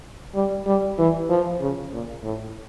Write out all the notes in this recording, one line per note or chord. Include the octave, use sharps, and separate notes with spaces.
G3
G3
E3
F3
C#3
A#2
A2